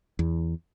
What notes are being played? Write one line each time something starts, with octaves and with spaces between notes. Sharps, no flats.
E2